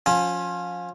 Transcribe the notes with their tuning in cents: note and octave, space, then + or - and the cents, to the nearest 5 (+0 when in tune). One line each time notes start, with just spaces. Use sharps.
F3 +25 C#4 +0